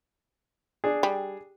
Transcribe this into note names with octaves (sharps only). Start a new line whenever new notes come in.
D4 G#4
G3